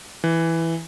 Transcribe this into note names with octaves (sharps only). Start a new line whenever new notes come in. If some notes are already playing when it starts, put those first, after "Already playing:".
E3